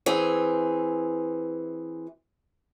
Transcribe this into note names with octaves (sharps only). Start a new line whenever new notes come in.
E3 C4 G#4